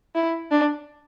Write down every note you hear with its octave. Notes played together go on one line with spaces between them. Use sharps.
E4
D4